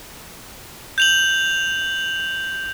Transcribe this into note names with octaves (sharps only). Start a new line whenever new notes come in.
G6 F7 F#7